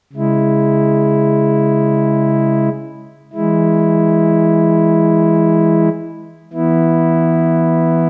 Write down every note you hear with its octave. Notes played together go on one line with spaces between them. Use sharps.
C#3 G#3 E4
E3 G#3 E4
E3 B3 E4